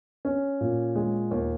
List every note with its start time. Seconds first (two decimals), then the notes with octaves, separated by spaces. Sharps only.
0.25 C#4
0.61 A#2
0.96 G#3
1.31 D#2